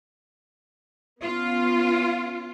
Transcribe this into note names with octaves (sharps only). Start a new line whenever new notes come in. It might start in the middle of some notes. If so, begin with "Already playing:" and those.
B3 C#4 F4